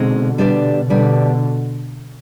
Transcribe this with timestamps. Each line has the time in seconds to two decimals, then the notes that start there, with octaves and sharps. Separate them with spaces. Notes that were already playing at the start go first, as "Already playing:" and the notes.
Already playing: B2 D3 G#3 C4 D#4
0.38 G3 B3 D4 G4 D5
0.90 B2 D3 G3 B3 D4 G4 D5